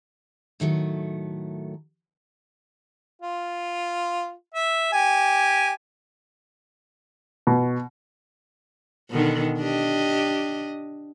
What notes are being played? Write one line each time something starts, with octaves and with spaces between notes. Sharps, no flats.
A2 D#3 F#3 A3
F4
E5
G4 G#5
B2
B2 D3 D#3
D4 G4 D#5